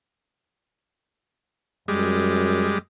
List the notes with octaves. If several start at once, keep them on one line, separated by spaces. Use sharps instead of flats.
F#2 G3 G#3